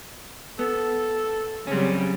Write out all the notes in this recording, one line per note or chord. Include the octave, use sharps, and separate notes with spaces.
B3 A4
C#3 F#3 G3 C4 C#4